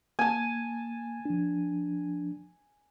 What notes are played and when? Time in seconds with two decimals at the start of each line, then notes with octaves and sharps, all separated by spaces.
0.19 A#3 G#5 A5
1.25 F3 D4